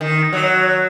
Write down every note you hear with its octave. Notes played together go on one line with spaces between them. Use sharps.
D#3
F#3